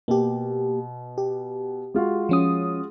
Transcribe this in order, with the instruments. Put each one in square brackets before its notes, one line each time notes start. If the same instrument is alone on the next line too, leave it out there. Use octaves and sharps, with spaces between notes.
[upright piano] B2 [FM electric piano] A#3 G4
[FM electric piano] G4
[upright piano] G#3 F4 F#4
[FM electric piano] F3 C#4 D#6